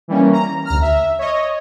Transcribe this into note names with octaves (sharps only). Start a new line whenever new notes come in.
E3 G3 A#3 C#4
A#5
D2 A#5 F6
E5
C#5 D#5